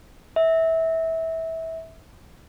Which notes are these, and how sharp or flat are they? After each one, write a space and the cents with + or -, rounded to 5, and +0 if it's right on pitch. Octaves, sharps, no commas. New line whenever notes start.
E5 -20